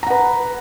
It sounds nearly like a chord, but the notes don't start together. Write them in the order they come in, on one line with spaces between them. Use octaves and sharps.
A#5 F#5 B4